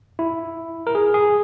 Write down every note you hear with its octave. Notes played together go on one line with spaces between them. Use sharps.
E4
A#4
G#4
G#4